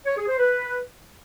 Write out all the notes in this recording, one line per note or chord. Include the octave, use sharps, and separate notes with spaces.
C#5
G#4
C5
B4